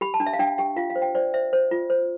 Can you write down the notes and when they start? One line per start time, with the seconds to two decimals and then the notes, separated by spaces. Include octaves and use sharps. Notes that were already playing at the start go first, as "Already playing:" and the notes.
0.01 G4 B5
0.14 A5
0.20 D4
0.26 E5
0.33 F5
0.39 D4 G5
0.58 G4 G5
0.76 F4 F5
0.90 F5
0.95 C5
1.02 G5
1.15 C5 D5
1.34 C5 E5
1.53 C5
1.71 F4
1.90 C5